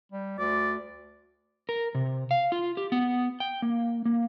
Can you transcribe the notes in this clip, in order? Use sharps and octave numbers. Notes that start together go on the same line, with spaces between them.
G3
D2 D5
A#4
C3
F5
F4
G4
B3
G5
A#3
A#3